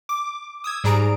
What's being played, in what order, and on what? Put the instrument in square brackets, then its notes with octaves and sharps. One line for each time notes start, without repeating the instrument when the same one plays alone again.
[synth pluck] D6
D#6 E6 G#6
G#2 G3 G#4 A#5 D7